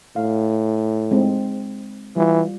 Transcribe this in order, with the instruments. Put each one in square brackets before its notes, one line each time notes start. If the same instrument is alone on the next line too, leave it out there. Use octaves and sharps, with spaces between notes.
[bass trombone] A2 [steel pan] F5
[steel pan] G#3 C4 D#4
[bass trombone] E3 [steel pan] G3 F4